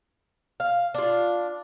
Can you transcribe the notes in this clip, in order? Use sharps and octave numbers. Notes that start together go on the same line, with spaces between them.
F5
D4 F4